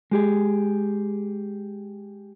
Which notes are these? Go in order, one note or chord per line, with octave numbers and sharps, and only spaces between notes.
G#3 G4 G#4